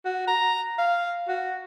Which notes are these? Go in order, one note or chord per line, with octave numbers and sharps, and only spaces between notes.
F#4
A#5
F5
F#4